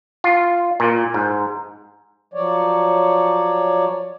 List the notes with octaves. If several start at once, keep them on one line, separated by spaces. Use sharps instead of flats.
F4
A#2
G#2
F3 F#3 C#5 D5